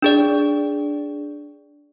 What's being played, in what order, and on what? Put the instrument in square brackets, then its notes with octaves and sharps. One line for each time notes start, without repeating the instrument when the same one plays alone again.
[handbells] D4 G#4 D5